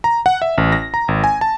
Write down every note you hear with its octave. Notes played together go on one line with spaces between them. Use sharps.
A#5
F#5
E5
A1
A#6
A#5
G#1
G#5
A5